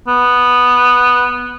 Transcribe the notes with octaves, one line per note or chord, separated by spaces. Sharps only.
B3